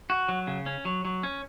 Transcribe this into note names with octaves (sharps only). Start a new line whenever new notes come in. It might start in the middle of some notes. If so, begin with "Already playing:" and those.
F#4
F#3
C#3
C#4
F#3
F#3
C#4